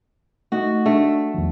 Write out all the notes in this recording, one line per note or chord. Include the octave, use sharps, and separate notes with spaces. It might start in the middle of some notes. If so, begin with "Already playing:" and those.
A3 D#4 F#4 D#5
A3 D4
E2 D#3 F3